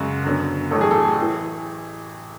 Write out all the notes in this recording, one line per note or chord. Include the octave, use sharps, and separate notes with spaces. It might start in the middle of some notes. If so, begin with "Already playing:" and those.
Already playing: F#2 C#3 G#3 F#4
F#2 D3 F#3 B3
A1 A2 F#3 A4
G#4
A4
E3